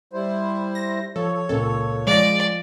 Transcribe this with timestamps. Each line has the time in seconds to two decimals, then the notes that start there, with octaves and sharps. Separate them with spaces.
0.13 G3 E4 C5
0.75 A#6
1.16 F3 A4 C#5
1.49 C#2 A#2 A4
2.07 F3 G#3 D5 A#6